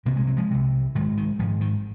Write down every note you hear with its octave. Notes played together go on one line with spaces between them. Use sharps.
C2 C3 A#3
G#3
F#3
F3 G#3
C2 C3
G#1 G#2 D#3 F#3
D#3
G#1 G#2 F3
D#3